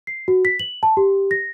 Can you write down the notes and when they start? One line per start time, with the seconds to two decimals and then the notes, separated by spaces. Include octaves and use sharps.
0.07 C7
0.28 F#4
0.45 B6
0.59 F#7
0.83 A5
0.97 G4
1.31 A#6